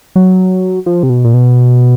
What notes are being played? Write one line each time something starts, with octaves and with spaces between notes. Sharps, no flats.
F#3
F3
C3
B2
A#2
B2